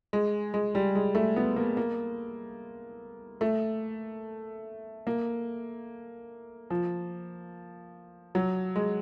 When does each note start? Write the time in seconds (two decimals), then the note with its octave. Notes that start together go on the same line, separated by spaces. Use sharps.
0.13 G#3
0.54 G#3
0.75 G3
0.95 G#3
1.15 A3
1.36 B3
1.56 A#3
1.77 A#3
3.41 A3
5.07 A#3
6.70 F3
8.35 F#3
8.76 G#3